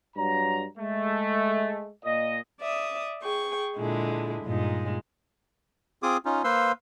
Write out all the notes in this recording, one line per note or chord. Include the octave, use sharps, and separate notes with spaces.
G2 F#3 A#5
G#3 A3
A#2 D#5
D5 E5 D#6
G#4 G5 C#6
A#2 D3 G#3 E4
G2 A#2 G#3 D#4
C4 F4 G#4 D6 D#6
C#4 D#4 F4
A#3 B4 C5 F5 C6 E6